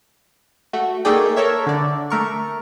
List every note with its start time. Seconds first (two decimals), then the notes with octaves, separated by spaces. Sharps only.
0.73 A3 F#4
1.05 A3 A#3 D#4 G#4 D5 G5
1.36 A4 A#4 C#5 E5
1.66 D3 D5
2.10 A3 A#4 C#6